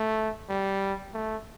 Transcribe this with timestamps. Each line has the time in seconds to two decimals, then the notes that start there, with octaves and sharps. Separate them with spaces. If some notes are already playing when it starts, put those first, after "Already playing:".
Already playing: A3
0.49 G3
1.14 A3